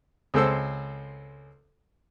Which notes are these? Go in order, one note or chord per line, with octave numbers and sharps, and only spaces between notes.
C#2 G#3 C4 A4 C5 E6